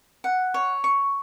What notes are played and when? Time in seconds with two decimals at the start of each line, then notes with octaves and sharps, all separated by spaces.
0.24 F#5
0.54 C#5
0.84 C#6